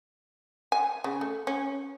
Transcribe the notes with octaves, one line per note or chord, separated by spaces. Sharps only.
G#5
C#3
A3
C#4